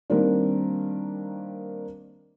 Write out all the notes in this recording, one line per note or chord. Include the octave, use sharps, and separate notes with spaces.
D#3 G3 A#3 C4 D4